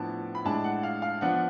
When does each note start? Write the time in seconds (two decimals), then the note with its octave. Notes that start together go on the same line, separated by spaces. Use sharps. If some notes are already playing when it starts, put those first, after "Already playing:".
Already playing: A2 F3 B3 D4 A5 B5
0.35 B5
0.45 A2 G#3 D4 A5
0.64 F#5
0.83 F5
1.02 F5
1.21 F3 B3 D4 F#5